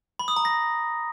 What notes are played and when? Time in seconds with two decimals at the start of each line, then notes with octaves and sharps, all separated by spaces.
0.19 B5
0.28 D#6
0.36 A#5
0.45 A#6